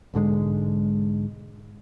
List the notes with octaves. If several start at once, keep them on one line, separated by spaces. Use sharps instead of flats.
B1 G#2 D3 G#3